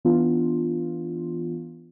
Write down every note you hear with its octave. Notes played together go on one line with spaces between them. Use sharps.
E3 B3 D4 F4